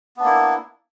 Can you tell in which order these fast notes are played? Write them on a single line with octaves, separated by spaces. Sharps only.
B3 D4 A#3 E4